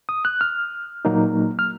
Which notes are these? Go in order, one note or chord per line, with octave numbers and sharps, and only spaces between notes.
D#6
F#6
F6
A#2 F#3 A#3 D#4
F6